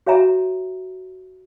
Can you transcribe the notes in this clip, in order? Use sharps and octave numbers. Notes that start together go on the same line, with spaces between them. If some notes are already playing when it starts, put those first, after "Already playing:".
F#4 C#5 E5 G#5 A#5